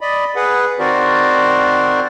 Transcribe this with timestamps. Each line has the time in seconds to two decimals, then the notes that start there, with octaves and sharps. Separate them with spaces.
0.01 D5 D#5 B5
0.36 G#4 B4 F#5
0.79 D#3 C4 F#4 A#4 C5 D5